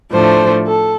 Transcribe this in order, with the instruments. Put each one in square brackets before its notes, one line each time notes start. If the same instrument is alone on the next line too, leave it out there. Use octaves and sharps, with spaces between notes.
[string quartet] A2 F3 A3 D4 [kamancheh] C5
[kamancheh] A4